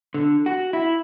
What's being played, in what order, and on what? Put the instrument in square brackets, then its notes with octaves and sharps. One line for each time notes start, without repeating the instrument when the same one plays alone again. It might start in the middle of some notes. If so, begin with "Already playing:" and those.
[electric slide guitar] D3
F#4
E4